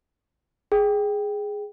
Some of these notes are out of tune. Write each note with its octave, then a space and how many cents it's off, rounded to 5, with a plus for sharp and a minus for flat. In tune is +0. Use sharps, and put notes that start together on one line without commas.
G#4 +0 G5 +0